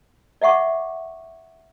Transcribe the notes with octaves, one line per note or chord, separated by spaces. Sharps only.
D5 E5 F#5 C#6 D6